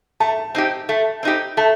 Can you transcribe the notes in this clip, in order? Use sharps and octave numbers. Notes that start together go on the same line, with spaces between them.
A3 A5
C4 D#4 G4
A3
C4 D#4 G4
A3 A5